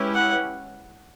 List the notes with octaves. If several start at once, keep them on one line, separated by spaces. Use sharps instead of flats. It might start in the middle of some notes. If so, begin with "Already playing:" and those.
Already playing: G#3 C#4 E4 G4 B4
F#5